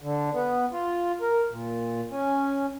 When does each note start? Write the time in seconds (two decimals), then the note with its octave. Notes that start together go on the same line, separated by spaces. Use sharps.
0.01 D3
0.34 B3
0.72 F4
1.21 A#4
1.51 A#2
2.11 C#4